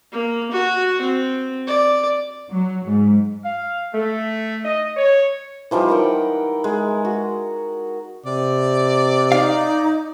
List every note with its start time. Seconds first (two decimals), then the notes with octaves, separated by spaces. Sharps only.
0.12 A#3
0.51 F#4
1.02 C4
1.67 D5
2.49 F#3
2.88 G#2
3.45 F5
3.94 A3
4.65 D#5
4.97 C#5
5.71 E3 F3 G3 D#4
5.88 A#4 F#5 G5
6.64 G#3
7.05 F#4
8.26 C3 D5
9.32 D#4 F5